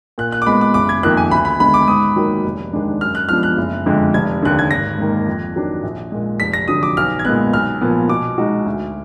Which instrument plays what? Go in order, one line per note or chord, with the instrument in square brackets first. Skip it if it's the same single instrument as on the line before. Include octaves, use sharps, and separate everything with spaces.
[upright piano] A#2 [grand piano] F#6
[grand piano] F#6
D6
[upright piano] G#3 B3 [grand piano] B5
[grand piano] D6
[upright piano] F#1 [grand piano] D6
[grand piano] G#6
[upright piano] F2 D#3 A#3 [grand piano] F#6
[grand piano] G#5
[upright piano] D2 [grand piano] B5
[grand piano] B5
[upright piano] D3 G#3 B3 [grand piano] B5
[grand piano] D6
[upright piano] G#2 [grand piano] D#6
[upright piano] D#3 F#3 A#3
F1
D#2 D#3 G#3 D4
[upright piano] F#2 [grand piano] F6
[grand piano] F#6
[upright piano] F3 G#3 B3 D4 [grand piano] F6
[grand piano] F#6
[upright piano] F#1
F2 D3 G#3
[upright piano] F1 [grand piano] G#6
[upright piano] D#2 D3 [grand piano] F#6
[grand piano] G#6
[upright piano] G#1 [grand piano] A#6
[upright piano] G#2 D#3 A#3
F2
D#3 F#3 D4
A#1
A#2 G#3
[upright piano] F1 [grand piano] B6
[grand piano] A#6
[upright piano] F2 D3 F#3 [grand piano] D#6
[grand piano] D6
[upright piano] B1 [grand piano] F6
[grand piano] G#6
[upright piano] A#2 G#3 B3 [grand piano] F#6
[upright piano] B1 [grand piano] F6
[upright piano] A#2 F3 B3
[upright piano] B2 [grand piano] D6
[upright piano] G#3 D#4 F#4
D2